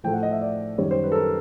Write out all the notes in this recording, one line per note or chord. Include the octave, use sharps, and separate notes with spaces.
A2 F3 A3 G5
F#5
D#5
E5
D5
F#2 D#3 G3 C#5
C5
B4
A4
A#4